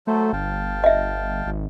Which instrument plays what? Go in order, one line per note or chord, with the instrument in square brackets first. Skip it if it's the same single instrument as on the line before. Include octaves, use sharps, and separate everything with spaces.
[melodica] F#3 A4 C5 [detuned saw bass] A3
[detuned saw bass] G1 [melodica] F5 G5 A5
[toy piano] D#5 E5
[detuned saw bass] G#1